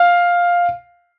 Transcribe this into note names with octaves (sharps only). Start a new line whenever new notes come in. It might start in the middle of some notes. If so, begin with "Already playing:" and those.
Already playing: F5